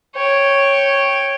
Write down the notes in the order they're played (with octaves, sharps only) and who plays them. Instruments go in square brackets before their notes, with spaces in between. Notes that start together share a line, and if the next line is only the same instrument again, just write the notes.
[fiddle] C#5 G5